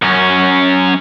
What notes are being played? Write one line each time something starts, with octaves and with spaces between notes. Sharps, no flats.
F#2 C#4